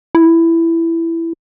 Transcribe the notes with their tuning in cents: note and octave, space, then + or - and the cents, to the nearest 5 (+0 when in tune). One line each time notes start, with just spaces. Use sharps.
E4 +10